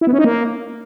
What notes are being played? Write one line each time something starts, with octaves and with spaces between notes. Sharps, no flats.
E4
B3
C#4
D#4
A#3